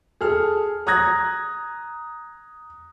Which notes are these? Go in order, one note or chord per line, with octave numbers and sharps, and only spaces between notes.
G#4 A4 F6
A#5 D#6 F#6 G#6 A#6